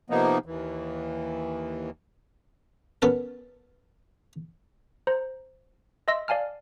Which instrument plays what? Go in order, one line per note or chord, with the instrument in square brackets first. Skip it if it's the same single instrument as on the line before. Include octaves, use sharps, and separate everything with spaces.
[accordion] C3 F3 A#3 B3 D#4
D#2 E3
[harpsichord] B3 C#4 A4 A#4
[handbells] C5 A#5
D#5 E5 C6 E6 A#6
D5 F5 G#5 A5 F6